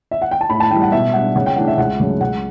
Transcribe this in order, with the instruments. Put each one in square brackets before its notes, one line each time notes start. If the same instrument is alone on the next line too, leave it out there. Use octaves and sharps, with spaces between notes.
[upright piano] E5
F#5
G5
A5
A2 B5
A5
E3 G3 G5
F#5
B2 E5
G3 D4 F#5
C#3 F#5
G5
E3 A3 D4 F#5
E5
C#2 F#5
C#3 F#3 A3
C#2 F#5